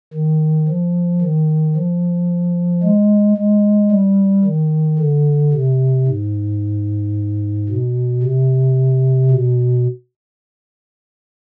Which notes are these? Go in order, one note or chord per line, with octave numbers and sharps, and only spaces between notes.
D#3
F3
D#3
F3
G#3
G#3
G3
D#3
D3
C3
G#2
B2
C3
B2